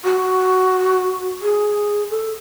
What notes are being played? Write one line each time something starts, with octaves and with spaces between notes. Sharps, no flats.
F#4
G#4
A4